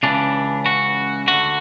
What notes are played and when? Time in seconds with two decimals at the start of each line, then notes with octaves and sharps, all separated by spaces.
0.03 C#2 C#3 E3 D4
0.66 F#4
1.27 D2 D3 F#4